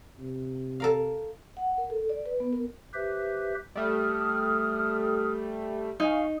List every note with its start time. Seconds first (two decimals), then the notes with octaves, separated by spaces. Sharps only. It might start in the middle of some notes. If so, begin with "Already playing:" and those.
0.19 C3
0.80 A4 A#4 F5
1.57 F#5
1.78 A#4
1.90 A4
2.09 D5
2.26 B4
2.40 B3
2.53 A#4
2.94 G4 B4 C5 E5
3.76 G3 A3 D#6 F6
6.00 D#4 F5 G#5 C#6